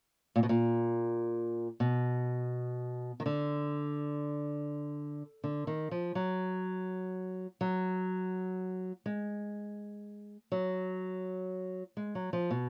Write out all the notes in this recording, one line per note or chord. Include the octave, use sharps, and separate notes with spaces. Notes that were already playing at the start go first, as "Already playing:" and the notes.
A#2
B2
A#2
B2
D#3
D3
D3
D#3
F3
F#3
F#3
G#3
F#3
G#3
F#3
F3
B2